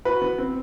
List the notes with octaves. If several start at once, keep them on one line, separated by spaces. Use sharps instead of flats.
F#4 B4
B3
C4